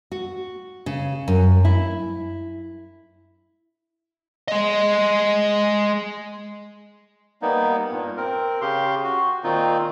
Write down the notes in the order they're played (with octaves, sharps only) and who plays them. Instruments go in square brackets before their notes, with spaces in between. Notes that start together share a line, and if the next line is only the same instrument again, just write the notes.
[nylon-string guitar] F#4
C#3
F#2
E4
[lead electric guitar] G#3 D#5
[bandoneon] G3 A#3 B3 D#4
G2 A#2
C4 A#4
C#3 G4 C6
F#4
A#2 D#3 C4 D#4 F4